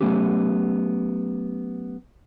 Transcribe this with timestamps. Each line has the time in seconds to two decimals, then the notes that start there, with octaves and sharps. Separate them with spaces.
0.01 F#3 G#3 A3 B3 C#4 G4